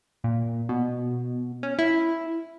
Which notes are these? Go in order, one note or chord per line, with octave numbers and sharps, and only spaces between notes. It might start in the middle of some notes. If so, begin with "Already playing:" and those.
A#2
B2
C#4
E4